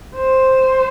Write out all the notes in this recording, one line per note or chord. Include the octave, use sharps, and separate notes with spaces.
C5